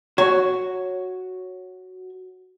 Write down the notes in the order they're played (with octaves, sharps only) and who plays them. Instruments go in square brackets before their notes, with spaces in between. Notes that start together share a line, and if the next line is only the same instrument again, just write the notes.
[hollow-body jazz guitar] F#4 C#5